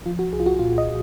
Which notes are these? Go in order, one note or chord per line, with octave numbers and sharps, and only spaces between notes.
F3 F4
F#4
C2 G#4
F4
F#4
A#2 F4
D#5